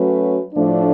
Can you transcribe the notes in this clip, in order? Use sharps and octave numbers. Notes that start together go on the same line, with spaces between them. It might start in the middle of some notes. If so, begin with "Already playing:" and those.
Already playing: F#3 A3 C#4 F#4 B4
A2 F3 A3 D4